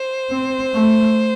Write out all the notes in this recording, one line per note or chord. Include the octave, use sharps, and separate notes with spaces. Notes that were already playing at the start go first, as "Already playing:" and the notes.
Already playing: C5
C4
A3